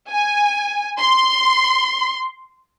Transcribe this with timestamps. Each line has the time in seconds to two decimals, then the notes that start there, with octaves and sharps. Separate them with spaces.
0.11 G#5
1.00 C6